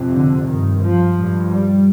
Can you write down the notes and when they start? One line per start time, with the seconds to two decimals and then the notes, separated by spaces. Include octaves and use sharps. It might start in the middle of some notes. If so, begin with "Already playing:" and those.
Already playing: F2 C3
0.15 D3
0.48 G2 D#3
0.82 F3
1.17 G2
1.51 G3